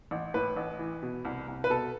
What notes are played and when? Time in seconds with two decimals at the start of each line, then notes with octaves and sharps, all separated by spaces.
0.11 A1
0.34 A2 B4
0.56 A1
0.79 E3
1.03 B2
1.25 C2
1.48 C2
1.64 B4
1.70 B2 A4